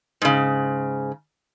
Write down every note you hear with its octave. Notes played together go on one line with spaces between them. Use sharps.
G#2 C#3